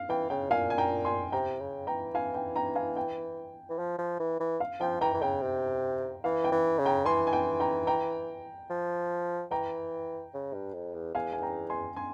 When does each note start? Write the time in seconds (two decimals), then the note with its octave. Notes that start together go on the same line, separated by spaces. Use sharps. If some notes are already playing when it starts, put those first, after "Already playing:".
Already playing: F5
0.09 E3 G5
0.30 C#3 G5
0.50 A#2 F5 G#5
0.70 G#5
0.78 G5 A#5
1.05 G#5 C6
1.32 C3 G5 A#5
1.60 C#3
1.87 E3 G5 A#5
2.15 F5 G#5
2.34 G5
2.56 G5 A#5
2.75 F5 G#5
2.96 G5
3.69 E3
3.79 F3
3.98 F3
4.20 E3
4.40 E3
4.60 F5
4.80 F3 G5
5.01 E3 G5 A#5
5.14 E3
5.22 C#3 G5
5.42 C3
6.24 E3 F5
6.44 G5
6.52 E3
6.79 C#3
6.86 G5 A#5
7.06 E3 G#5 C6
7.27 G#5
7.33 G5
7.60 G5 A#5
7.87 G5 A#5
8.70 F3
9.51 E3 G5 A#5
10.34 C#3
10.54 G2
10.74 F2
10.94 E2
11.15 E2 F5 G#5
11.33 G#5
11.42 G5 A#5
11.70 G#5 C6
11.96 G#5 C6